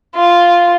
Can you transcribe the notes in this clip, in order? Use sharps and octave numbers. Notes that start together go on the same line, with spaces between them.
F4